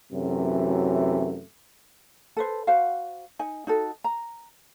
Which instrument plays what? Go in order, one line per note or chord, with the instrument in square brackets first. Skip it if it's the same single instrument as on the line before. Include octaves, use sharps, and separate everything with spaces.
[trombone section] F#2 C3 E3 F#3 A3
[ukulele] A4 B4 C5
F#4 C5 F5 F#5
D#4 G#5
D#4 F#4 A4
A#5